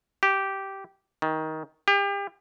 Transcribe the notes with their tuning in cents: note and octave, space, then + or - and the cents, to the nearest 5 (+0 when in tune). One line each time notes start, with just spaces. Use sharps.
G4 -10
D#3 +15
G4 +35